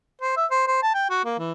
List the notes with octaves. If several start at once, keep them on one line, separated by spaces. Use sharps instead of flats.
C5
E5
C5
C5
A5
G5
F#4
A#3
E3